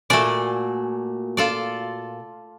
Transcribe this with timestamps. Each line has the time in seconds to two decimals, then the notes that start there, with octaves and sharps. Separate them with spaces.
0.10 A#2 A3 F#4 D5 G#5
1.37 F4 A4 D5